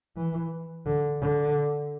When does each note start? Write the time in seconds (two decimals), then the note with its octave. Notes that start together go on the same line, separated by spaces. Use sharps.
0.17 E3
0.86 D3
1.21 D3